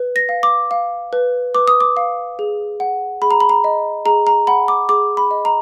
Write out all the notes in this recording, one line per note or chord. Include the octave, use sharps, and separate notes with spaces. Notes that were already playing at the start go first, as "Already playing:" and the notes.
Already playing: B4
A#6
F5
D6
F5
B4
B4 D6
D#6
D6
F5
G#4
F#5
G#4 B5
A#5
B5
A#5
D#5
G#4 A#5
A#5
F#5 B5
D6
G#4 D6
B5
D#5
A#5